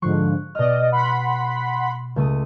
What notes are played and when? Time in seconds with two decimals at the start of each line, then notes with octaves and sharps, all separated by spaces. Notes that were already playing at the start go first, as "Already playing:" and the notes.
0.02 G#2 D3 F3 C#6 F#6 C7
0.55 B2 D5 D#5 F6
0.92 F#5 B5 C6
2.16 C#2 A3 D#6